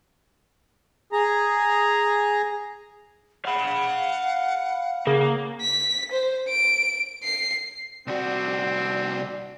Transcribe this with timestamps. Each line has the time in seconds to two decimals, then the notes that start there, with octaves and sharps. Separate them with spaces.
1.13 G#4 A#5
3.45 F5 F#5 B5
5.07 C#3 A#3
5.61 B6
6.12 C5
6.48 D7
7.23 C7
8.07 C2 C4 F#4 D5